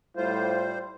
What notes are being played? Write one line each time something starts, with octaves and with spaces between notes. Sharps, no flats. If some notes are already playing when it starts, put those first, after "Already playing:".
A2 G3 F4 C5